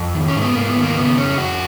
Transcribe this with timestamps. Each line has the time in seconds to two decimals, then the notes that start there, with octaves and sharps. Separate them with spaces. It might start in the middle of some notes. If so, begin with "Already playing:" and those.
Already playing: F2
0.15 D#3
0.28 C#4
0.35 G#2
0.42 B3
0.55 G#2 A#3
0.69 B3
0.77 D#3
0.83 A#3
0.96 C#3 B3
1.18 F2 C#4
1.38 F2 F#4